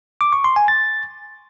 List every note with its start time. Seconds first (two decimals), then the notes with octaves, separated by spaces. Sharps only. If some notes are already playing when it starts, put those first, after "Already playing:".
0.21 D6
0.33 C#6
0.44 C6
0.56 G#5
0.68 A6